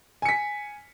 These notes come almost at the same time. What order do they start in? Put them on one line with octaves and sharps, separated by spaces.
G#5 C#7 B6